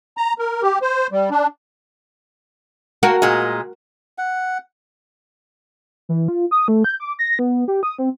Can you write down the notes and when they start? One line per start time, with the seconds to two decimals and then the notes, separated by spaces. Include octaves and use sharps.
0.17 A#5
0.39 A#4
0.62 G4
0.82 C5
1.12 G3
1.31 D4
3.03 A#3 F#4 A#4
3.22 A#2 G#3
4.18 F#5
6.09 E3
6.28 F4
6.51 D#6
6.68 A3
6.84 G6
7.00 D6
7.19 A#6
7.39 B3
7.68 G4
7.83 D#6
7.99 C4